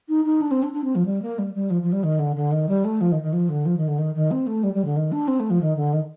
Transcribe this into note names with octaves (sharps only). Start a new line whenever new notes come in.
D#4
D#4
D4
C4
D4
D4
C4
F3
G3
A#3
G3
G3
F3
F3
G3
D#3
D3
D3
D#3
G3
A3
F3
D#3
D#3
F3
D3
F3
D#3
D3
D#3
D#3
C4
A3
G3
G3
D3
D#3
D4
C4
A3
F3
D#3
D3
D#3